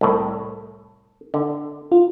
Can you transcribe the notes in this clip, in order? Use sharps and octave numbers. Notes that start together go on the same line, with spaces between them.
C2 A2
D3
F4